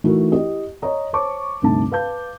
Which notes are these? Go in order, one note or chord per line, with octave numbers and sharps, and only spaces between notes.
E3 A3 D#4 E4 F#4 A#4
E4 G4 D#5
C#5 D#5 A#5
C5 C#5 A5 C#6 D6
D2 G2 C3 A3 D#4 A5
B4 F5 A5 G6